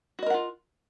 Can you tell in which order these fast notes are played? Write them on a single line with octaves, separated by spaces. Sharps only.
F#4 D#5 A#4 F#5 F4